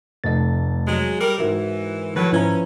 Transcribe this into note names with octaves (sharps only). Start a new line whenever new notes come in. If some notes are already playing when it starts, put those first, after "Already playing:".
F1 A3 D#5 A6
F#3 G#3
G3 A#4
G#2 E3 F#4 A#4
A2 D#3 F3 F#3 B4
G#2 F3 C#4 E4 B4 A#5